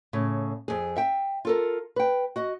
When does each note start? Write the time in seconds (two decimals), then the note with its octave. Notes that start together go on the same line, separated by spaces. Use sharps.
0.13 A2 C#3
0.68 F2 G#4
0.97 E5 G5
1.45 F4 A4 A#4
1.96 B4 G5
2.36 F#4 D#5